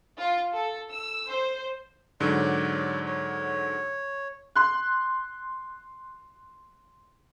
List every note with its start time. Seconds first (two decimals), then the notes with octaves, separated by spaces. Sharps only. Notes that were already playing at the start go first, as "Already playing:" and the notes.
0.17 F4 F5
0.53 A4
0.89 E6
1.27 C5
2.20 G#2 D3 F#3 C#5 D5
3.06 C#5
4.56 C6 F#6